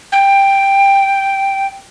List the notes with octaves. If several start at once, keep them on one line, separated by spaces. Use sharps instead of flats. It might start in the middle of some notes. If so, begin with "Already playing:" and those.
G5